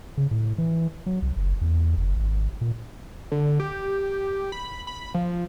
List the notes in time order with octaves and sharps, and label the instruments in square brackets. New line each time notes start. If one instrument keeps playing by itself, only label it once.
[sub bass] C#3
A2
E3
F#3
C2
F#1
E2
F#1
G#1
A#2
[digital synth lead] D3
G4
B5
B5
F3